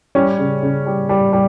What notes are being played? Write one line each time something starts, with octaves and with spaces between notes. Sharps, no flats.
G3 C#4
C#3
C#3
G3
G3
G3